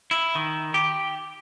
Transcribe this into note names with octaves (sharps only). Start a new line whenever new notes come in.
E4
D#3
G4